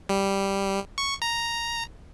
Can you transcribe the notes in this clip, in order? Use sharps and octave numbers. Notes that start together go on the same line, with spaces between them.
G3
C#6
A#5